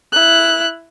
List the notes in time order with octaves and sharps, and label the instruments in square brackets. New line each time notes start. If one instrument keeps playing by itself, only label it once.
[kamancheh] E4 F#6